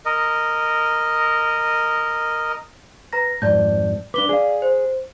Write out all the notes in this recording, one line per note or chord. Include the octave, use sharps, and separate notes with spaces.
A#4 D#5
B4 A#5 A#6
F2 G#2 D5 A5 G6
D4 B4 D6 G7
G#4 D5 F5
C5